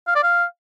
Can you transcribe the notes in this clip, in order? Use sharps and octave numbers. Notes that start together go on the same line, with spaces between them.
F5
D5
F5